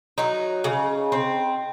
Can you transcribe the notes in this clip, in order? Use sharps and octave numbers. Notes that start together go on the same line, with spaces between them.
F#3 D#4
C#3
C4